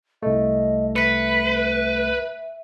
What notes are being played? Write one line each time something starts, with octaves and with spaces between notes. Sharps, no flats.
C2 A3 D#5
B4 E5 B6 C#7